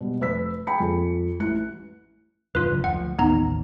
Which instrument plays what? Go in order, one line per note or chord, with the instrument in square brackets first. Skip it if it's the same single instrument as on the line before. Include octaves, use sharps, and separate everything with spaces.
[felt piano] B2 G3
F1 B4 E6 B6
G#4 G5 G#5 B5 C#7
F2
A1 E3 F#6 C#7
[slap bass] D#1 F#2 D4 [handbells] F4 B4
[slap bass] F#1 F#2
[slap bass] D2 F3 [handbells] F#5
[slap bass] A1 D#2 [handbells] B3 D#4 A#5